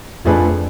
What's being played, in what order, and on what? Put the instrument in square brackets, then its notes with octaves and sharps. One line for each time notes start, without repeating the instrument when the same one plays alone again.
[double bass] F2 [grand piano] F3 A3 D4 G#4 B4